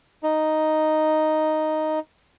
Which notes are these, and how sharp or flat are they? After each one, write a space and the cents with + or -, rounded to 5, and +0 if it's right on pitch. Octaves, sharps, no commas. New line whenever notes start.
D#4 +0